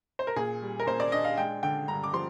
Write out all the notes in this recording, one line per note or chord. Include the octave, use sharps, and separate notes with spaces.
C5
A#4
A#2 G#4
G3
A#4
A#2 C5
D5
D4 D#5
F5
G#3 G5
D3 G5
G2 A#5
D6
F3 C6